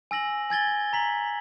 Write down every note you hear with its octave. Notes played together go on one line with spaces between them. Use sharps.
G#5 E6 A#6 F#7
G#5 G#6 A6 G7
A#5 B6 F#7